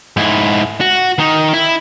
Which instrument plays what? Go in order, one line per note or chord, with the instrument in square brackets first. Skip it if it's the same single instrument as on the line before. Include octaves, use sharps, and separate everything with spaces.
[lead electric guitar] G#2 E4
F#4
D#3 D#4
E4